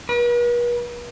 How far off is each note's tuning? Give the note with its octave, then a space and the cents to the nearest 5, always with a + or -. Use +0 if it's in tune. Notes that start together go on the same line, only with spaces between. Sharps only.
B4 -45